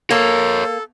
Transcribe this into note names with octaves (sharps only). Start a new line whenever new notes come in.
A#3 A4 A#4 C#5